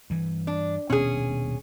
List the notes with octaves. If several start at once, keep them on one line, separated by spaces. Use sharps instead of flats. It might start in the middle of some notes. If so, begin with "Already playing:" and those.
G2 E3
D4
D#1 B2 C#4 D4 G#4